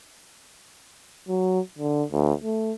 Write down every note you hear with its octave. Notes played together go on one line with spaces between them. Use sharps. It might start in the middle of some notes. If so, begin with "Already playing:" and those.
F#3
D3
D2
A3